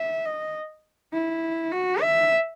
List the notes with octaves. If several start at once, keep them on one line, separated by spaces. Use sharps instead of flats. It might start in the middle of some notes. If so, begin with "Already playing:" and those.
Already playing: E5
D#5
E4
F#4
E5